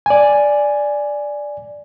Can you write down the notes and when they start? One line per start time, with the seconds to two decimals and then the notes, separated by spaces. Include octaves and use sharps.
0.06 D5 G#5